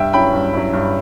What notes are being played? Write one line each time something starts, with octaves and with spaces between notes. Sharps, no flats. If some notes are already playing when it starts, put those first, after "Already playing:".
Already playing: G2 E5 G5
F#3 C#4 E4 G5 B5
G2
F#3 C#4 E4
G2